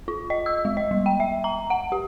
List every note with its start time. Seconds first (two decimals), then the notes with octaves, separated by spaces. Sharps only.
0.08 F4
0.30 D#5
0.46 E6
0.65 G#3
0.77 D#5
0.91 G3
1.06 G5
1.20 E5
1.44 A#5
1.70 F#5
1.92 G4